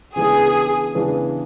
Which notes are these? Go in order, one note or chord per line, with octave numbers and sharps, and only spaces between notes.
C#3 E3 G#3 B3 D4 G#4
C#3 E3 G#3 B3 D4